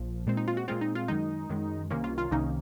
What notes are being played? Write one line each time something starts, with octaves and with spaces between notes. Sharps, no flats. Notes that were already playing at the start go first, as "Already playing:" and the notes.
Already playing: A#1 F3
A#2 G#3 C4
D#4
F4
F#4
A#2 G#3 C4 F4
D#4
F4
F#2 D#3 G#3 D#4
F#2 D#3 G#3
C2 C3 D#3 A#3 C#4
F4
F4
C2 C3 D#3 A#3 C#4 D#4